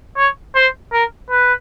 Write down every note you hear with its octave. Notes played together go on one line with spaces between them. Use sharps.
C#5
C5
A#4
B4